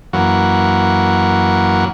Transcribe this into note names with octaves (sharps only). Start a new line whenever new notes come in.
F#2 E3 F#3 A#3 F#5